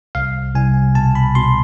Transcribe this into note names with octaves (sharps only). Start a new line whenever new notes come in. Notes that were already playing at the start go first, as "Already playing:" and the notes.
C2 F5
C2 G#5
B2 A5
B5
B2 C6